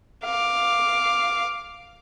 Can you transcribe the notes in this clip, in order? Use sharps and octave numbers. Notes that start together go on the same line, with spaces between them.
F5 D6